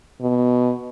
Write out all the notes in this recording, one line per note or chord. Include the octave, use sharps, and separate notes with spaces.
B2